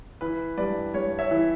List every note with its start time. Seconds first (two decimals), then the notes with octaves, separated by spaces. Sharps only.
0.21 E3 B4
0.58 G2 B4 D5
0.94 G2 C#5
1.19 C#5 E5
1.31 E3